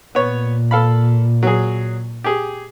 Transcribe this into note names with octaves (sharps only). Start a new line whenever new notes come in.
A#2 B3 C#5
A4 F5 B5
F#3 G#4
G4 G#4